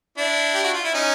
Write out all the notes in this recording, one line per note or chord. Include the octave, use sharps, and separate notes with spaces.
D4 E4
G4
F#4
F4
E4
C#4 D#4